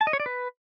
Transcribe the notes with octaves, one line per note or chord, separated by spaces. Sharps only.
A5
D#5
C#5
D5
B4